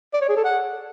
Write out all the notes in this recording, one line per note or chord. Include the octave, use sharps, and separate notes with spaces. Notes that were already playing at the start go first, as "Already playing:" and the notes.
D5
C#5
G#4
A4
F#5